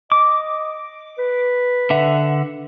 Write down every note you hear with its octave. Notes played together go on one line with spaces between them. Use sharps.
D#5 D6
B4
D3 E5 F#5